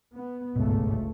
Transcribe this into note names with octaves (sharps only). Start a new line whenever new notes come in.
B3
G1 C#2 G#2 B2 A3